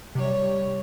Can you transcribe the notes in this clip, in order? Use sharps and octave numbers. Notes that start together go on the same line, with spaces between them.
C3 G3 C#5